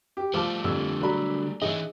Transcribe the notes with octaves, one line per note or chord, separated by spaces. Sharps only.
G4
F3 G3 A3 D#5 A5 D6
F2 D3 G4 C5 E6
F#3 A4 D5 A#5 B5
E3 C#4 D#4 G#4 D#5 E5